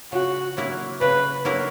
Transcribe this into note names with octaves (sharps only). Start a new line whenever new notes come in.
C#3 F#4
F#3 A#3 E4 A#4
C#3 B4
F#3 A#3 E4 A#4